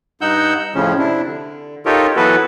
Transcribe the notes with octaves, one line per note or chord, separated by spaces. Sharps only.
G2 D#4 F#5 E6 G6
F2 A2 C#3 F3 C#4
C3 D4 E4
D3
D#4 F4 G4 A4 A#4 C#5
E3 F#3 B3 F#4 A4 B4